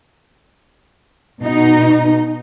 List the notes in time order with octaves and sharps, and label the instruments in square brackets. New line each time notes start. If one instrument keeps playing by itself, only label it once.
[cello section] B2 D#4